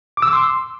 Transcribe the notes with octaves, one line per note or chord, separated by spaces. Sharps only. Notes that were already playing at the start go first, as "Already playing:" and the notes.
D6
E6
D6
C6